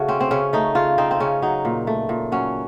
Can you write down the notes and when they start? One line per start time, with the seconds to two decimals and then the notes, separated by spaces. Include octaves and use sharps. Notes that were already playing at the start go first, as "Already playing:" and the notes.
Already playing: C#3 A3 F#4
0.09 C4 C#4
0.21 C4
0.31 C#3 C#4
0.53 A3 D#4
0.75 C#3 F4
0.98 C4 D#4
1.11 C4
1.20 C#3 C#4
1.42 F#3 D#4
1.65 A#2
1.87 A3
2.09 A#2
2.32 F#3 C#4